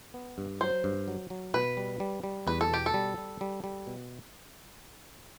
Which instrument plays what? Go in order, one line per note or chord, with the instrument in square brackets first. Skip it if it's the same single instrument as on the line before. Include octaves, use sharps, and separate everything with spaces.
[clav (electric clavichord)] B3
G2
[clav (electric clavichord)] F#3 [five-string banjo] C5
[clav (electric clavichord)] G2
F#3
F#3
[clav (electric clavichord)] B2 [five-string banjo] B4
[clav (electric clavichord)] G3
G3
G3
[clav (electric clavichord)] E2 [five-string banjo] B4
[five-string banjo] A4
[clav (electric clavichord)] B2 [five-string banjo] G4
[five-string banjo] A4
[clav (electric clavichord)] G3
G3
G3
G3
B2